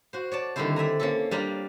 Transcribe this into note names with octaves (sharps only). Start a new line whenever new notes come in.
F#4 C5
C#5 D5 A5
D3 D#3 G3 C4 E4 C5
D5 E5 G#5 A#5
A#3 C#4 A4
G3 D4 F4 A#5